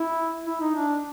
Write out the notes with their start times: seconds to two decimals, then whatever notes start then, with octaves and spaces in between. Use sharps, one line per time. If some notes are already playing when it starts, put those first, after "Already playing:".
Already playing: E4
0.46 E4
0.61 D#4
0.76 D4